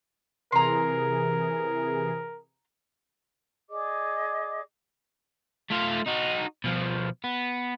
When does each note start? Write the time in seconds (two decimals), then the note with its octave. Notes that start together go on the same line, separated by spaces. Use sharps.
0.52 C3 E3 G#4 A#4 A#5 C6
3.68 G#4 D5 D#5 D6
5.70 A3 F4
6.06 D#4 F#4
6.64 B2 F3
7.24 B3